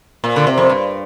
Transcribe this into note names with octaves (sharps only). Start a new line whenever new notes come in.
A#2
D3
C3
F2
G2